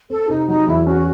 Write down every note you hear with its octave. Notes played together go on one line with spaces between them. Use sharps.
C4 A4
C3 D#4
F#3 D#4
E2 E4
C#4 F#4